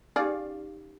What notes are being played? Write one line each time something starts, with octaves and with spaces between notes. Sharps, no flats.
C#4 D#4 G4 G#4 D5 F5